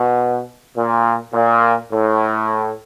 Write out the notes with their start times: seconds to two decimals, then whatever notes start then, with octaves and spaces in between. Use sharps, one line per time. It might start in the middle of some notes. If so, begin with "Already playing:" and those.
Already playing: B2
0.76 A#2
1.33 A#2
1.91 A2